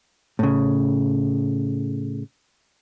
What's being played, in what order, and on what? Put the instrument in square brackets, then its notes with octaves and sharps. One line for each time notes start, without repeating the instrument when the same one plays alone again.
[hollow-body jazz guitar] A2 C#3